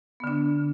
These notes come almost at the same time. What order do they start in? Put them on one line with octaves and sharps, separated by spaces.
B3 D3 D4